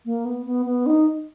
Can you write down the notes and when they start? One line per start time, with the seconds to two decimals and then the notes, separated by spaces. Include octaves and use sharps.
0.05 A#3
0.25 B3
0.46 B3
0.66 B3
0.86 D#4